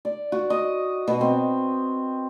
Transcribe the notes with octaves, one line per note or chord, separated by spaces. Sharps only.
D5
F#4
D#5
B2
C4